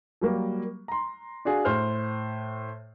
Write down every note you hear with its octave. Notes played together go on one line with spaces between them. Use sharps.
F#3 G3 A#3
A#5 C6
D4 F#4 G#4 F5
A2 C5 F6